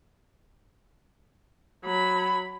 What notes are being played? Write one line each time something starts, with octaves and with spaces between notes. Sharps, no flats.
F#3 B5